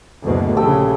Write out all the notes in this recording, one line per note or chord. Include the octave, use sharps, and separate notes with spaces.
F#1 D2 B2
A#1 C#3 G4 A4 E6